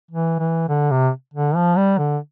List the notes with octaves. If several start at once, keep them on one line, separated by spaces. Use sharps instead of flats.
E3
E3
D3
C3
D3
F3
G3
D3